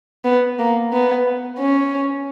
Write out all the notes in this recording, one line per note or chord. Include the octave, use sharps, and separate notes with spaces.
B3
A#3
B3
C#4